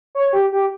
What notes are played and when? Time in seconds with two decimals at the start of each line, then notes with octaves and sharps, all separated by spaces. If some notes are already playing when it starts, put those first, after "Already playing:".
0.15 C#5
0.33 G4
0.52 G4